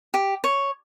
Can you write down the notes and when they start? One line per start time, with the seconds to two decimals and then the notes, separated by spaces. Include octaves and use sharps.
0.14 G4
0.44 C#5